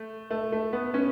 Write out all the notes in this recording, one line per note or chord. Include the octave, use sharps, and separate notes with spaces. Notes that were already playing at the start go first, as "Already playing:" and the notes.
Already playing: A3
A3
A3
B3
C#4